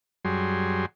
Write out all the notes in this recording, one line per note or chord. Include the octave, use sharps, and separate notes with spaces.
F#2 F#3 G3 G#4 C6